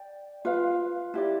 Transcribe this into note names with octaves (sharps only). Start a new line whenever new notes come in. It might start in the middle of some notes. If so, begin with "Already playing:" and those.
Already playing: D5 G5
F4 B4 F5
E4 G4 D5